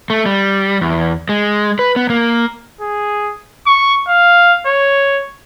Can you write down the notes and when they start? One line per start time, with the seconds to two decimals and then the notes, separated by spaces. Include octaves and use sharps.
0.10 A3
0.26 G3
0.81 E2
1.29 G#3
1.79 B4
1.96 B3
2.10 A#3
2.81 G#4
3.67 C#6
4.08 F5
4.66 C#5